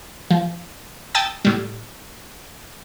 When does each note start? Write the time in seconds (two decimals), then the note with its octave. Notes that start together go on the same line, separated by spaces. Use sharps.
0.31 F3
1.15 G5 A5 D#6 E6 A6
1.45 A2 G3